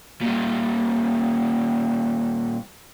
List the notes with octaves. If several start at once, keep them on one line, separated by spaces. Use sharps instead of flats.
A#2 G3